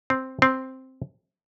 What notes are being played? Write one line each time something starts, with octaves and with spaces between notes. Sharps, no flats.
C4
C4